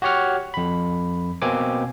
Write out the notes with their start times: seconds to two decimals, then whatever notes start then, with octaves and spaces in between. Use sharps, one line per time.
0.02 F#4 G4 C#5 F#5 F6
0.54 F2 B5
1.42 B2 A#3 C4 G#5 D6